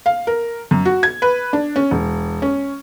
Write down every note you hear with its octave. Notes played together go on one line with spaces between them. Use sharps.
F5
A#4
F#2
F#4
G#6
B4
D4
C#4
E1
C#4